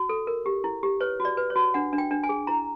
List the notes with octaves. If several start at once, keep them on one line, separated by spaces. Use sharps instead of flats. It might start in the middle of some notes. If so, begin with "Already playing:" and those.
Already playing: F#4
A4
A#4
G4
E4
G4
B4 C#5
F#4
D5
B4
C#5
F#4
D4 F#5
D4
G5
D4
G#5
G#4
E4 A#5